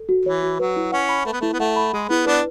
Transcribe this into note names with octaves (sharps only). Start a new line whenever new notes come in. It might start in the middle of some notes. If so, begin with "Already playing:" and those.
Already playing: A4
F#4
E3 C#5
F#4
F#3 B4
E4
C#4 F#5
B5
A3 B4
B3
A3 E4
B3
A3 F#5
B5
G#3 G#4
B3 E4
B3 D4 B4